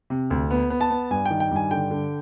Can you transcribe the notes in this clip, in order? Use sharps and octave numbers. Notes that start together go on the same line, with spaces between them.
C3
D2
B3
B3
A5
B3
G2 G#5
D#3 G5
G5
G2 G#5
D3 G5
D3